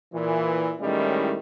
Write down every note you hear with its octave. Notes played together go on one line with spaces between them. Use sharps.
A#2 E3
A2 D#3 G3 G#3 C#4 E4